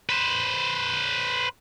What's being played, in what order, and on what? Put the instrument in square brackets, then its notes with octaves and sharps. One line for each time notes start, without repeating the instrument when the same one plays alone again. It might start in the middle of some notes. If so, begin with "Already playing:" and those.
[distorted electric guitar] B4 C5